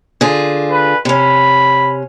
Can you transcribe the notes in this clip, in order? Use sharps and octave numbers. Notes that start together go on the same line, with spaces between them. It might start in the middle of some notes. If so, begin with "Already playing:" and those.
D3 F4 G#4
B4
C3 C#4 B5